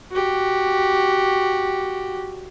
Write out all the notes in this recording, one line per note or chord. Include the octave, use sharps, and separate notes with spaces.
F#4 G4